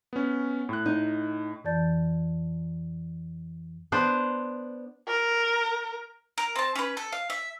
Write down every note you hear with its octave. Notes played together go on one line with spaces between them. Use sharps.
B3 C#4
A2 F#6
D#4
F2 E3 D5 A5 G6 A6
B3 D4 C5
A#4
A#4
C4 A5
C#4 B4
A4
F5
E5